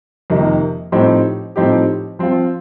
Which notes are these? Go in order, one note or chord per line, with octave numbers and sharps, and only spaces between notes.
F2 C3 D#3 A#3 D#4
A2 F3 C4 D#4 G4
A2 F3 C4 D#4 G4
F3 C4 F4